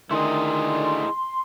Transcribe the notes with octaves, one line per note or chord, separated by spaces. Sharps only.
D3 D#3 A3 D4 E4 G#4 D#5 C6